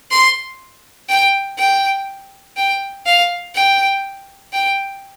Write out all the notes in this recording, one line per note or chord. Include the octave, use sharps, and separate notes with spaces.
C6
G5
G5
G5
F5
G5
G5